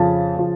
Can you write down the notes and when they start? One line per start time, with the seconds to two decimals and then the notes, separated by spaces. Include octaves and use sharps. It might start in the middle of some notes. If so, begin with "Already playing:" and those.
Already playing: F2 C#3 F3 A5
0.36 C#3 F3